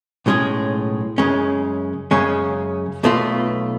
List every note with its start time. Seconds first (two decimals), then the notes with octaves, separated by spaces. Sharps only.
0.26 B1 A2 G#3 C#4 G#4
1.18 F#2 C#3 G#3 C#4
2.11 F#2 C#3 G#3 C#4
3.03 B1 B2 A3 F4